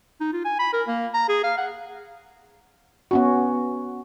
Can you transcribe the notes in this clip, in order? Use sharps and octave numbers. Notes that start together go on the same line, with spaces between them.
D#4
F4
G#5
B5
A#4
A#3
A#5
G#4
F5
F#5
B3 C#4 F#4